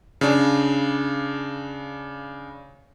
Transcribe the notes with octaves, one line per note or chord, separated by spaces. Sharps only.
C#3 D4